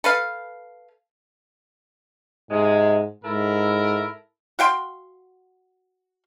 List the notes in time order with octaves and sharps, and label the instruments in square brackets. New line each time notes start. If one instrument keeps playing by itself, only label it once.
[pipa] A4 B4 F5
[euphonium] G#2 [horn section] C3 G#3
[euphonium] G#2 [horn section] E4 A4 A#4
[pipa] F#4 F5 G5 C6